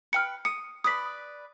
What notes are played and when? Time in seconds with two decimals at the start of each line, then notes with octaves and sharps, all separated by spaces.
0.13 B4 G5 B5 F6 C#7
0.45 D#6 C#7
0.84 B4 D5 B5 D#6 B6